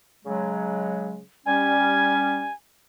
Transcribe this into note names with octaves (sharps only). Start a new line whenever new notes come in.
C#3 F#3 G#3
G3 C#4 G#5